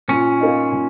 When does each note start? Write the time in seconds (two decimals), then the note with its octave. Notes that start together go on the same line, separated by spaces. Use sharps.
0.08 A#2 C#4
0.40 A#3 D#4
0.72 A#2